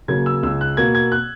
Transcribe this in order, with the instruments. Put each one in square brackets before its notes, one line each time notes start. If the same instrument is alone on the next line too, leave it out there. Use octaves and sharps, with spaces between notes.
[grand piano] C#3 F#3 A#3 G#6
E6
C#2 E6
F#6
B2 A#3 G#6
G#6
F#6